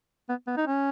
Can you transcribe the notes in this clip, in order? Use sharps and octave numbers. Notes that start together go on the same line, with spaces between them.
B3
B3
D#4
C#4